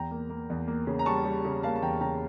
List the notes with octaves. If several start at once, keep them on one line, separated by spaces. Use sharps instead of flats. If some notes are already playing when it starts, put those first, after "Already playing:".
Already playing: E2 G5 A#5
A#3
A#3
E2
A#3
C#3
A#5
G3 A5 C#6
G3
C#3
A#3 F5 A5
A5
E2 G5 A#5
C#3 G5 A#5